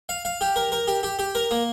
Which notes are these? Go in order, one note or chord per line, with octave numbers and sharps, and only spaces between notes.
F5
F5
G4
A#4
A#4
G4
G4
G4
A#4
A#3